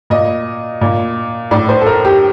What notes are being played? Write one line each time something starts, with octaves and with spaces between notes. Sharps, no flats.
A#2 D#5
A#2
A2 D5
C5
A4
A#4
G4